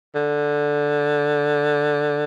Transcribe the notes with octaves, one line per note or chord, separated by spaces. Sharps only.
D3